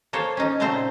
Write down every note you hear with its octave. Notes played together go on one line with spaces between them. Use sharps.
A#3 A4 C5 C#5
C#4 D#4
A#2 C#3 A3 C4 C5 A#5